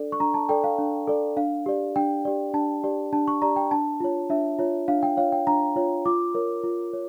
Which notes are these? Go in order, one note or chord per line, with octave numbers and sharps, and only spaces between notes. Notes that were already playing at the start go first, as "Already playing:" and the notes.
Already playing: D4 A4 D5
C#6
D4 A#5
A5
A4 D5 G5
F5
D4
A4 D5
D4 F5
G4 D5
D4 G5
G4 D5
D4 A5
G4 D5
D4 A5
C#6
G4 D5 A#5
G5
D4 A5
F4 C#5
D4 E5
F4 C#5
D4 F5
G5
F4 C#5 F5
G5
D4 A#5
F4 C#5
F4 D6
A#4 C#5
F4
C#5